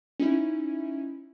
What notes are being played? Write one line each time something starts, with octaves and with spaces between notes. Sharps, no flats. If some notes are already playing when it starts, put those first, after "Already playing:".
C#4 D#4 E4